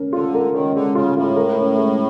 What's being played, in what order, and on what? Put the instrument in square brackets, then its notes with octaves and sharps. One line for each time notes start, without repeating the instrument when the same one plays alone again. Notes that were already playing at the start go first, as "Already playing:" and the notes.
Already playing: [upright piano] C#4 A#4
[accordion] D3 [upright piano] F4
[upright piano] A#4
[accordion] D#3 [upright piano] C#4
[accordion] D3 [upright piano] G#3
[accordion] C#3 [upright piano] F4
[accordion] A2 [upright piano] F4
[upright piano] A#4
C#4
G#3